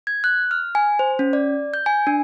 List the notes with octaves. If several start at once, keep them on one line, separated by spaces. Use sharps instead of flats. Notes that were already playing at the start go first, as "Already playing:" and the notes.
G#6
F#6
F6
G#5
C5
C#4
D5
G6
G#5
D4